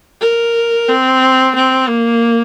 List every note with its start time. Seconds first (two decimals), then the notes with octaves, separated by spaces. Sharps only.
0.21 A#4
0.88 C4
1.55 C4
1.88 A#3